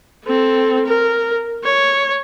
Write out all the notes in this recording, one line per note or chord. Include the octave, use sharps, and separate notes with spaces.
C4 A4
A#4
C#5